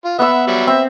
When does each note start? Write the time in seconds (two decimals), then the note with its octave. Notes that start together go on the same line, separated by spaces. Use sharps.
0.04 F4
0.19 B3 E5 F#5 E6
0.47 F#3 G3 E5
0.67 C4 E5